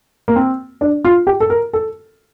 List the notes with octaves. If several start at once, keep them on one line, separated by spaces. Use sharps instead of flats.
A#3
C4
D4
F4
G4
A4
A#4
A4